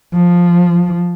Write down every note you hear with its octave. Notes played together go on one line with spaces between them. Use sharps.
F3